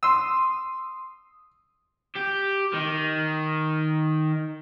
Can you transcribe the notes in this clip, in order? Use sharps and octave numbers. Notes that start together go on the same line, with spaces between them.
C6 D#6 E6
G4
D#3